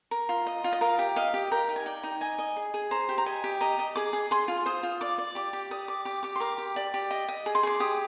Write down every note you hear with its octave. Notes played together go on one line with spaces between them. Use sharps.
A#4
F4
D#5
F4
D#5
A#4 F5
G4
D#5 F5
G4
A#4 G5
D#4
G#5
D5 G5
D#4
D#5 G#5
D#5
G#4
G#4
C5 A#5
G4
A#5
D#5 G#5
G4
D#5 A#5
D#5
G#4 D6
G#4
G#4 C6
F4
C5 D#6
F4
D5 D6
D5
G4 D6
G4
D5 D#6
D5 D6
G4 D6
G4 D6
C6
A#4 D6
G4
D5
G4
D#5
D#5
G#4
C6
G#4 D6
G4 D#6